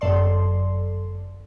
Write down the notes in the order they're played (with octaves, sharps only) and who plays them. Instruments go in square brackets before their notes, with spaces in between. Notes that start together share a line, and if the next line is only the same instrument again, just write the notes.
[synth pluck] G1 F#2 A4 D5 C6